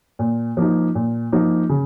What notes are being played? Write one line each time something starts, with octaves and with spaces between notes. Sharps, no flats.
A#2
F3 A#3 D#4
A#2
F3 A#3 D#4
C#3